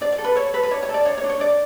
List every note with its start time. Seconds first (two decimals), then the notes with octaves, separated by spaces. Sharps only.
0.01 D4 D5
0.12 D5
0.18 A4
0.24 B4
0.35 A4 C#5
0.53 A4 B4
0.63 B4
0.71 D4 C#5
0.83 C#5
0.89 A4
0.94 D5
1.05 D4 C#5
1.18 C#5
1.24 D4
1.29 C#5
1.40 D4 D5